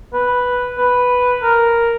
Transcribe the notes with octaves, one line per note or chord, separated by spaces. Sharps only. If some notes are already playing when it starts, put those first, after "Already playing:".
B4
B4
A#4